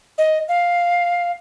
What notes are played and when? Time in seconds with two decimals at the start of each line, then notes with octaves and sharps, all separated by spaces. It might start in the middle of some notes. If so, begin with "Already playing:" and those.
0.18 D#5
0.49 F5